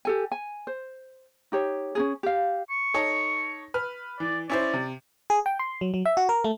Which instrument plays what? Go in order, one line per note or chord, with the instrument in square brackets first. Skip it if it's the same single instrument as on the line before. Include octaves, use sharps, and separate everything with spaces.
[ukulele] G4 A4 G#5
G#5
C5
D#4 G4 C#5
C#4 D#4 G#4
G4 F5
[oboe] C#6
[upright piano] D#4 A4 C#5
B4 F6
[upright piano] E3 [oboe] D5
[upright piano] C#4 E4 C5 [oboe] D5
[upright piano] C3
[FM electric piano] G#4
G5
C6
F#3
F#3
E5
F#4
A#4
A3